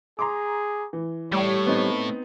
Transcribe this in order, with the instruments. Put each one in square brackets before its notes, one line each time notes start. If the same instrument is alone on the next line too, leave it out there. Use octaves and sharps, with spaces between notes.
[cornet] G#4 [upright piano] A#5 C6 D6
[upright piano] E3
[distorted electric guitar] A2 [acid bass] G3 [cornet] C#5
[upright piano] B3 C4 D#4